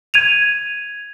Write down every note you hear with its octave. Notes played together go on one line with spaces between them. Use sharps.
G#6 D#7 F7